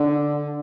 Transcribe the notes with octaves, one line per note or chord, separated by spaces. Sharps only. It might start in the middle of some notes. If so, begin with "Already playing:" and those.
Already playing: D3